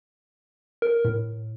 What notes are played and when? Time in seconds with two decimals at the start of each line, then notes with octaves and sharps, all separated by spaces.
0.82 A#4
1.05 A2